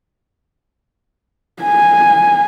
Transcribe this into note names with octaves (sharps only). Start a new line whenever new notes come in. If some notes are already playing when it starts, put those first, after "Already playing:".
G#5